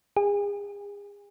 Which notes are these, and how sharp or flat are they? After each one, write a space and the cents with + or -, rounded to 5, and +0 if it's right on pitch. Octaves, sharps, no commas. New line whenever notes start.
G#4 -35